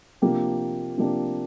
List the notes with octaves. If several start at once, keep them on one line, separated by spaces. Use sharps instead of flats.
C3 F3 A#3 D4 G4
C3 F3 A#3 D4 G4